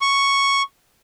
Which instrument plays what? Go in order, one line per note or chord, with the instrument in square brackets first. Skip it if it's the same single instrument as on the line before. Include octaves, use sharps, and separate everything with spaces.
[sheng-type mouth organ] C#6